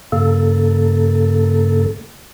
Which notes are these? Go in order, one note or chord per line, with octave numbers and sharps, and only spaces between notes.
G2 C#3 A#3 A4